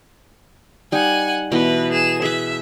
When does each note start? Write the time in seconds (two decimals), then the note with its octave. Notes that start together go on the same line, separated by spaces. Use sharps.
0.92 G3 D#4 F#5 G#5
1.52 B2 E3 B4 D#5
1.92 G#4 E7
2.22 G#4 B4 E5